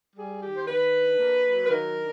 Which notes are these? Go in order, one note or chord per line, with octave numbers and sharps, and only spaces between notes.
G3 G#4
D#3 G4
C5
D#3 B4
D4
A#3
F#3
B4
D#3 A#4
D4